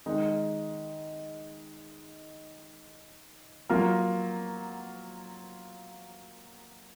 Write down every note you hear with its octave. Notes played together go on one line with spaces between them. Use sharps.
D#3 G#3 D#4
F#3 A#3 F4 A#4